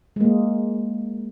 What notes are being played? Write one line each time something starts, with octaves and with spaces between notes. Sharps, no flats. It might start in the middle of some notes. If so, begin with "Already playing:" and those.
G#3 A#3